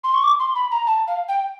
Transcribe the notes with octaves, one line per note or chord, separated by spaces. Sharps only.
C6
C#6
D6
C6
B5
A#5
A5
F5
G5